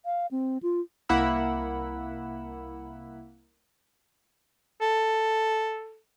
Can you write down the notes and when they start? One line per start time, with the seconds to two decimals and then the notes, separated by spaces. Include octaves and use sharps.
0.05 F5
0.31 C4
0.63 F4
1.09 C2 A#3 E4 F#5 B5 E6
4.81 A4